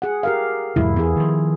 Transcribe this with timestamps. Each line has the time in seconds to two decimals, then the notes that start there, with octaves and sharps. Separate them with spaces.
0.02 G#4 F#5
0.23 G4 A#4 F5
0.76 E2 G#2 C3 E4
0.96 E2 B3 G#4
1.16 D#3 F3